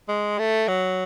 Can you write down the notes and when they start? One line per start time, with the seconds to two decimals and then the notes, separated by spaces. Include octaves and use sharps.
0.09 G#3
0.39 A3
0.68 F#3